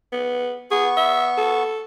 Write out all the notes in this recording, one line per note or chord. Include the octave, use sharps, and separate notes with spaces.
B3
B3 G#4 C#6
E5
A4